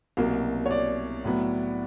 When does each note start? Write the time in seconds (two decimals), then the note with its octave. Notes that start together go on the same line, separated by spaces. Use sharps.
0.17 C2 B2 F#3 A#3
0.66 C#5
0.71 D5
1.25 A2 F#3 B3